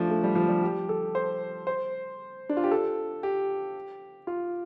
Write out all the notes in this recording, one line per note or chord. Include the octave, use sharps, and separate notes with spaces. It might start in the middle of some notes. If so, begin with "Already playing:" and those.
Already playing: F3 A3 D4
A3
G3
F3
G3
G4
A4
C5
C5
D4
F4
G4
A4
G4
F4